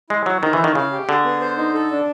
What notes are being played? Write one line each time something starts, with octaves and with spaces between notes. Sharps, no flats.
G#3 E4
F#3 G#4
D#3 C5
E3
E4
D#3
C#3 F5
G4
D3 G#4
B3
C5
D#4
A4
D4